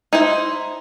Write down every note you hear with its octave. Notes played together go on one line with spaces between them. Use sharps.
D#4 E4 C5